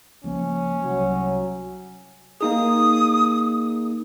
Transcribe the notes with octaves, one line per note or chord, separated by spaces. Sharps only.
C#2 F3 A#3 C#4
C2 F#3
A#3 D#4 G#4 D#6